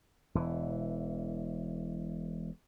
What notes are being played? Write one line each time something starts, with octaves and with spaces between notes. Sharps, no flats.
E1 E3